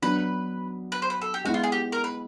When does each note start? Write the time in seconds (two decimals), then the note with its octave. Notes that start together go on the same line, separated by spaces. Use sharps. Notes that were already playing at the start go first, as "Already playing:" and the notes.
0.02 F#3 B3 D4 B4
0.92 B4
1.02 C5
1.10 B4
1.22 A4
1.34 G4
1.45 G#3 B3 E4 F#4
1.54 F4
1.64 G#4
1.72 G4
1.92 A#4
2.04 B4